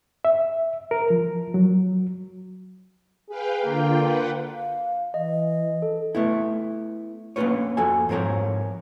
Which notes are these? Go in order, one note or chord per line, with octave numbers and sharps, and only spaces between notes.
E5
A#4
F3
F#3
G#4 B4 F5 G5
D3 A#3 F4 G5
B4 F#5
F5
E3 D#5
A4
A3 B3 E4
A#3 C#4 D#4 F4 B4 C#5
F2 F3 F#4 A4 G#5
G#2 F3 C4 A#4 C#5